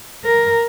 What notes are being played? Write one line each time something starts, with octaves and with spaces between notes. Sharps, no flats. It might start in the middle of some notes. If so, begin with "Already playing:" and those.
A#4